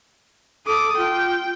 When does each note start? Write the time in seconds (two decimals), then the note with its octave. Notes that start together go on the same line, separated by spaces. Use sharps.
0.67 A4 D6 D#6
0.97 F4 G5